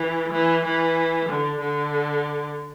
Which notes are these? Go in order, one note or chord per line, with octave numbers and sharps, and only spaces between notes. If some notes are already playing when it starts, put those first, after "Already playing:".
Already playing: E3
E3
E3
D3
D3